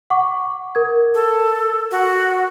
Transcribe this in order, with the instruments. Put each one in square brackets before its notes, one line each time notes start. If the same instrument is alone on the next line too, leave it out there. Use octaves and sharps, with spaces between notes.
[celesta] F#5 C#6 D6
A#4 G#6
[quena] A4
F#4